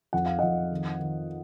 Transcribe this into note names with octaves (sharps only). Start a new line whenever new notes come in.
F2 F#5
F5
F2 D#5 F#5
D#3
D#3